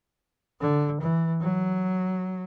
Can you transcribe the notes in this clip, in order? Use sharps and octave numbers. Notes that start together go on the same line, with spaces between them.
D3
E3
F#3